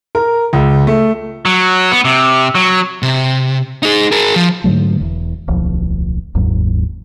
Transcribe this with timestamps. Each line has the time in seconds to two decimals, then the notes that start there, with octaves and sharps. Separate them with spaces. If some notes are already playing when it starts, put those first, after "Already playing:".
0.15 A#4
0.53 C#2
0.87 A3
1.45 F#3
1.91 B3
2.05 C3
2.55 F#3
3.03 C3
3.83 D#4 G#4
4.12 G#4 A#4
4.36 F3
4.64 G#2 D3 F#3 A3
5.01 E1 E2
5.48 D1 B1 F3
6.35 F#1 D#2 G#2 F#3